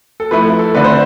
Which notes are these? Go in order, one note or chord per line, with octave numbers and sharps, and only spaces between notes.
A4
F3 A3 E4 B4
A4
D3 A3 D4 B4
C5